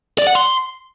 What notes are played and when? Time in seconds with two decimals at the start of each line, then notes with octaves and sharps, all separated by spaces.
0.19 D5
0.27 F#5
0.35 C6